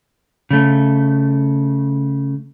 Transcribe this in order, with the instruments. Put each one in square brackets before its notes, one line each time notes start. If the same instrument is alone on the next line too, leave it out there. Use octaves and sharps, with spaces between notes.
[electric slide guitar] C#3 A3